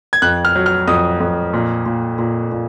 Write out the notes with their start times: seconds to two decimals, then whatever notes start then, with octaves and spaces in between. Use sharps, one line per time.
0.13 G#6
0.22 F2 F#6
0.45 F6
0.56 F#3
0.66 F6
0.87 F2 D#6
1.20 F2
1.53 A#2
1.86 A#2
2.18 A#2
2.52 A#2